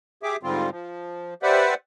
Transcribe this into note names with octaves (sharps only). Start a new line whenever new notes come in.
G4 G#4 E5 D6
G#2 D3 G3 C4 F4
F3
G4 B4 C5 D5 E5 F#5